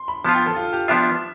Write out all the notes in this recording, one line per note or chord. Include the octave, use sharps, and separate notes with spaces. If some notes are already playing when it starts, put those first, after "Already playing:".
Already playing: C6
B5
F3 B3 F4 A5
G5
A4
F4
G4
F3 B3 D4 F4 E5